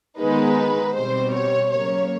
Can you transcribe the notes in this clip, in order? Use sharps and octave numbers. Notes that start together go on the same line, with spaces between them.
D#3 G#3 B3 D#4 B4
B2 G3 C4 C5
C#5
C#3 F#3 A#3 C#5